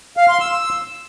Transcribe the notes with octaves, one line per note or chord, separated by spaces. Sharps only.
F5
C6
E6